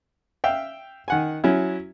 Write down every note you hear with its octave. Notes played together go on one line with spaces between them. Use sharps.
E5 F5 G5
D#3 F#5 G#5
F#3 C#4 E4